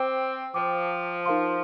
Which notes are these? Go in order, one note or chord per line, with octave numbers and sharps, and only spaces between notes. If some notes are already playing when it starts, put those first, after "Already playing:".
Already playing: C4 C5 G5 D6
F3 C5 G5 D6
D#4 A#4 F5 C6